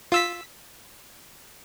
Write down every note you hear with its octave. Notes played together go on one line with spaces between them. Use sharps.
F4 E6 B6